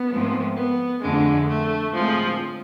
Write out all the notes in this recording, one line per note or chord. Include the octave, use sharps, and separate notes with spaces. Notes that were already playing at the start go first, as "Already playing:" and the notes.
Already playing: B3
G#2 F3 A3 C4
B3
F2 D3 G#3 A3
A3
A2 F3 G#3 C4 F4 G#4